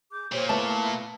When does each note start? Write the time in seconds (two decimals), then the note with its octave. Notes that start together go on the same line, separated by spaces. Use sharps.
0.12 G#4 D6 G6
0.32 A#2 G4 C5 C#5
0.49 A3 B3 E4 A5